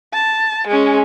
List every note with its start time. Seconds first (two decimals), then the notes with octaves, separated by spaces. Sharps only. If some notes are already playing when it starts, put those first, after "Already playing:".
0.13 A5
0.68 G#3 C#4